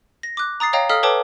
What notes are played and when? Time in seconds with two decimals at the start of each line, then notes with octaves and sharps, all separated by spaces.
0.23 A#6
0.37 D6 F#6
0.60 A#5 D#6 A6 C7
0.73 C#5 D#5 F5 G5 A#5
0.89 A4 D#5 F5 D#6 F6 B6
1.03 A4 B4 C#5 G5 A5 D6